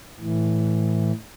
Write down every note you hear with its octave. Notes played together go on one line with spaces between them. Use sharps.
A2 E3